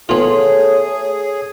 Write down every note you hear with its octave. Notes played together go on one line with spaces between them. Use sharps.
A3 B3 F4 G#4 C#5